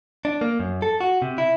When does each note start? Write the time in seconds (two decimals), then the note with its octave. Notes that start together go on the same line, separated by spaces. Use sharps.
0.25 D4
0.41 A#3
0.60 F#2
0.82 A4
1.01 F#4
1.22 C3
1.38 E4